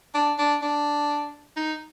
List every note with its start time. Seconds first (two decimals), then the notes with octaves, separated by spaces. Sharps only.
0.15 D4
0.39 D4
0.62 D4
1.56 D#4